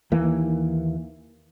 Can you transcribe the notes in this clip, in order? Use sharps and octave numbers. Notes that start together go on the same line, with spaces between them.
D#2 E3 A#3